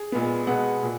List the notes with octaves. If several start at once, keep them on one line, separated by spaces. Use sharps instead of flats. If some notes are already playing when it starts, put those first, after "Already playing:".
Already playing: G#4
A#2 G#3 B3
B2 G#3 B3 F#5
A#2